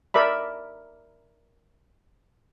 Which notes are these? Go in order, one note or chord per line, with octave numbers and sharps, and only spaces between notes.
A#4 D5 E5 B5